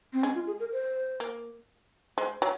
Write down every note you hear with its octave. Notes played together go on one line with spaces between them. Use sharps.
C4
G#3 C#4
F4
G#4
A#4
C5
A#3
G#3 C5
F#3 C#5